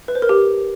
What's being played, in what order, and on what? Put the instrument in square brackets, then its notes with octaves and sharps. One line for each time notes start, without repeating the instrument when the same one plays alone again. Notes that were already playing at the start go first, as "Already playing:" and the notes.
[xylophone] B4
C5
A#4
G4